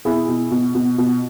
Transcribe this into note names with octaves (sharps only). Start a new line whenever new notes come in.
B2 E4 G#4
B2
B2
B2
B2